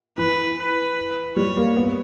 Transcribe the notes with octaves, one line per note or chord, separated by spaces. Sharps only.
E3 B4
B4
G3 C#5
A#3
B3